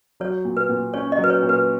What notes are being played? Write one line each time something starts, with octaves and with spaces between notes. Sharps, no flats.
F#3 C#5
A#2
B4
A#2
C#4 C#5
D#5
F#3
B4
C#5
A#2
B4